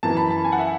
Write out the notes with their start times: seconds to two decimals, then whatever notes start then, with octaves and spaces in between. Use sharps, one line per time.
0.03 F#2 E3 A5
0.17 B5
0.31 A5
0.44 G#5
0.52 F#5
0.59 E5